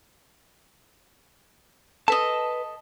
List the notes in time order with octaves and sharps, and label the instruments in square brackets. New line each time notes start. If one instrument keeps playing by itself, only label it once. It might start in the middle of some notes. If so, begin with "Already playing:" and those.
[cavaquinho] A4 D#5 [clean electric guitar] B4 A5